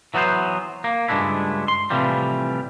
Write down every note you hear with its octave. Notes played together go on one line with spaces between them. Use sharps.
E3 F#3 B3 A4 C5
A#3
C#2 G2 G#3 A3 D4 E4
C6
A2 C3 E3 F3 G3